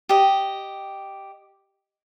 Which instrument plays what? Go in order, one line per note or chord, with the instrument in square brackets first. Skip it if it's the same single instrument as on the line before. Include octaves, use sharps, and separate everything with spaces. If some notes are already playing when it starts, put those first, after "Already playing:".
[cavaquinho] G4 D#5